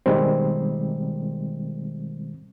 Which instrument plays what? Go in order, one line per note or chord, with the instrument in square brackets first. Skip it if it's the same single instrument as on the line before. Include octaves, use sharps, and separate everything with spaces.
[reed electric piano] B2 D#3 G3 G#3 C4